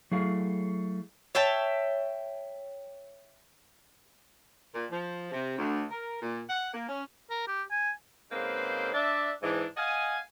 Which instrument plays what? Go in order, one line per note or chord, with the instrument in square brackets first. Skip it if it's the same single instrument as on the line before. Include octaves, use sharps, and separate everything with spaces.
[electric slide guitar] F#3 A3 E4 G#4 F5
[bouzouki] C#5 E5 G5 A5
[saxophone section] A#2
F3
C3
D2
A#4
A#2
F#5
A#3
C#4
[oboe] A#4
G4
G#5
[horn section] G#2 C#3 A#3 C4 B4 C5
D4 E5
G#2 E3 D4
D#5 F5 F#5 G#5